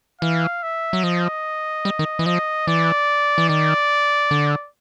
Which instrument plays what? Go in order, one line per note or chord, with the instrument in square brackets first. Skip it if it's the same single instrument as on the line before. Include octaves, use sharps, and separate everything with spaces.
[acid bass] E3 [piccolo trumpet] F5
[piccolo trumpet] E5
[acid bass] F#3
[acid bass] F3 [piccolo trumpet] D#5
[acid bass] G3
D#3
E3
[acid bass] F3 [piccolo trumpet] D#5
[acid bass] E3 [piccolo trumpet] D5
[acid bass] E3
[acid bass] D#3 [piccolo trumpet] D5
[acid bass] D3